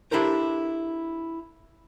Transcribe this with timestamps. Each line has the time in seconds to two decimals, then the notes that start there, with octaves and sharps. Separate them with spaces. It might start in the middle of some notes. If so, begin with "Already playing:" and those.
0.11 D4 E4 G4 A4 A#4 C5